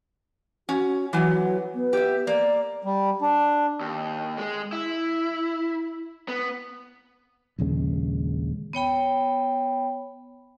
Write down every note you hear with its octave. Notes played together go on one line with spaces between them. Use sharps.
C#4 F#4
E3 F#3 B3 G#5
B3
G4 E5
A#3 D5
G3
D4
D#2
G#3
E4
B3
A#1 D#2 C#3 G#3
B3 C#5 G5 B5